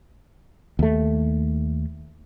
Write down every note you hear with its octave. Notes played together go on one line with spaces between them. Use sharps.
D#2 A3